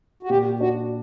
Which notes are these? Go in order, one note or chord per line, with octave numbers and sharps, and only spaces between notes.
F#4
A#2 G4
D4 F#4